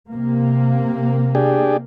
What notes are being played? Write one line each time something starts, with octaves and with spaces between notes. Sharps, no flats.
C3 A#3
D4 G4 G#4